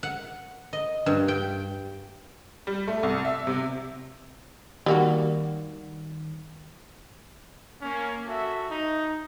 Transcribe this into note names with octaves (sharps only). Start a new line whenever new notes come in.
F#5
D#5
G2
G5
G3
A3
C2
E5
C3
D#3 G3 A#3 F#4
A#3 C#4
F#4 A4 E5
D#4